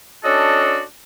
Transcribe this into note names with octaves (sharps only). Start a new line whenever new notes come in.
C#4 D4 F#4 A4 D#5